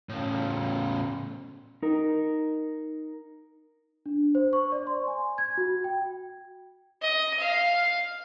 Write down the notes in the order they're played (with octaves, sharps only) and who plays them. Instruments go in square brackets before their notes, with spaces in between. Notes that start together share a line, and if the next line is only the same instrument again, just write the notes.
[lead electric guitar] A2 C#3
[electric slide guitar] D#4 A#4
[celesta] D4
C5
C#6
D5
C6
G#5
G#6
F#4
G5
[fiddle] D#5
F5